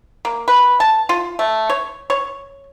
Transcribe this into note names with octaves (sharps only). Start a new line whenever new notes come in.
A#3
B4
A5
F4
A3
C#5
C#5